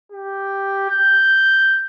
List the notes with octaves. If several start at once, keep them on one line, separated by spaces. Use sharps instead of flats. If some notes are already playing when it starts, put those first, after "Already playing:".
G4
G6